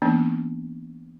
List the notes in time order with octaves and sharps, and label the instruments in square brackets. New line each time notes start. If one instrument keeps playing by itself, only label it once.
[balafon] E3 A#3 B3 C#4 D4